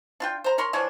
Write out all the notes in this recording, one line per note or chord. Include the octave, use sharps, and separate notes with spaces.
D4 F4 G5
C5 A#5
A#4 C#5 A#5 C6
E3 F3 D4 C#5